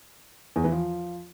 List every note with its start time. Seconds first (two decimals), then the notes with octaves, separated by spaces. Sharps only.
0.56 E2
0.64 E3
0.72 F3